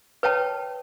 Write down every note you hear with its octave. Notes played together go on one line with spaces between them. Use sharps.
B4 C#5 G5 A5